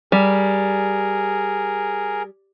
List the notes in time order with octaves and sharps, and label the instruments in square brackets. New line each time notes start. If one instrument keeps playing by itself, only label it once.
[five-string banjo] G3 [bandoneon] G#4 A#4